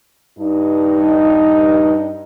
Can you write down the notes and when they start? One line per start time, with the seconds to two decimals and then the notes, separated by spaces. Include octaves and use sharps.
0.38 G2 D#4